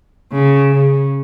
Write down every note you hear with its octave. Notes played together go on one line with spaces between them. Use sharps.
C#3
C#3